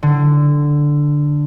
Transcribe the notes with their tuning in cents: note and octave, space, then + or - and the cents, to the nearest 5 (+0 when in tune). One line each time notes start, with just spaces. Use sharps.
D3 +0